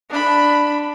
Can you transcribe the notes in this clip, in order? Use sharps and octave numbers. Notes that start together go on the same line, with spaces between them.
D4 B5